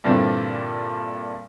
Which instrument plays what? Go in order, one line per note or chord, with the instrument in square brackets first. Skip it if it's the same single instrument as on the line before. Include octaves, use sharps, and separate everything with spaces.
[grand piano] G2 A#2 D3 E3 C4